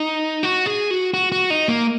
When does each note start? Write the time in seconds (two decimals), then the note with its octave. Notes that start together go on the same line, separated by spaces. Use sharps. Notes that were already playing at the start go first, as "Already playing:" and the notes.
Already playing: D#4
0.43 F#4
0.66 G#4
0.91 F#4
1.14 F#4
1.32 F#4
1.50 D#4
1.68 A#3